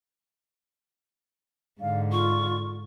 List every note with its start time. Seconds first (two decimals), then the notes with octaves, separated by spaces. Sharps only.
1.81 G#2 D3 F5
2.12 F4 C#6